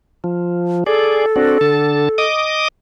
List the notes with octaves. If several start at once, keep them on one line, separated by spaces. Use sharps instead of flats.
F3
G#4 A4 D5
C4 D4 F#4
D3 A5
D#5 D6 D#6